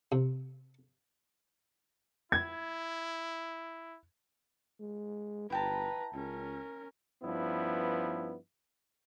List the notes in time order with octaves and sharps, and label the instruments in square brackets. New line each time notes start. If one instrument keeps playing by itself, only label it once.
[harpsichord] C3
[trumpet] E4 [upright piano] G#6
[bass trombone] G#3
[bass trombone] G1 [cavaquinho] E4 G5 A5 [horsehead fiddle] B4 A#5
[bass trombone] C#2 [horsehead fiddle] C#4 A#4
[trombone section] G2 F3 B3 C#4 E4